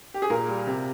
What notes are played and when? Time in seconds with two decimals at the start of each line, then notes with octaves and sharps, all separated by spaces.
0.14 G4
0.22 G#4
0.30 A#2 A#4
0.48 G3
0.67 C3